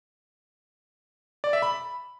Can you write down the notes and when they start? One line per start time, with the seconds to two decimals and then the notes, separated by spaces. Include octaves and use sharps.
1.44 D5
1.53 E5
1.62 B5